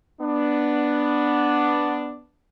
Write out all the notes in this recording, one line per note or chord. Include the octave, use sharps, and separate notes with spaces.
B3 D4